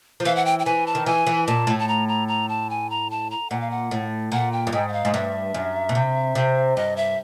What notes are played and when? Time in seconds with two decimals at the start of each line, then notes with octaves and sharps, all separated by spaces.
0.20 F3
0.25 E3 F5
0.36 F#5
0.46 G5
0.59 G5
0.65 E3 G#5
0.87 A5
0.95 D#3
1.06 E3 G#5
1.27 E3
1.47 A#2 A5
1.67 A2
1.79 A5
1.88 A#5
2.08 A#5
2.28 A#5
2.49 A5
2.70 G#5
2.90 A#5
3.10 A5
3.31 A#5
3.50 A#2 F#5
3.61 F5
3.71 F#5
3.91 A2
4.32 A#2 F#5
4.52 G5
4.67 G2
4.73 G#2 G5
4.88 F#5
4.93 F5
5.05 G#2
5.14 G2 E5
5.54 F#2
5.89 B2
5.95 C3
6.35 C3
6.76 G2 D#5
6.96 E5